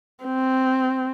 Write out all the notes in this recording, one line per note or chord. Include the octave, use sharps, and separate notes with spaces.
C4